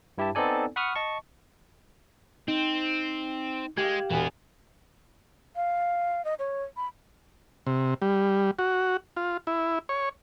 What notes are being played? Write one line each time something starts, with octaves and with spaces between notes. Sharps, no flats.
G2 E4 G4 E5 A5
B3 C4 D#4 A4 D5 G#5
F#5 B5 C#6 D#6 F6
D#5 A5 C#6
C4 D#4
G#3 G4 F5 G#6 E7
E1 A#2 E3 B3 F#4 G#5
F5
D#5
C#5
B5
C3
G3
F#4
F4
E4
C#5